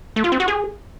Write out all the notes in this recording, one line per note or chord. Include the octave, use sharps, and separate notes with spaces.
A3
F4
C4
F#4
G#4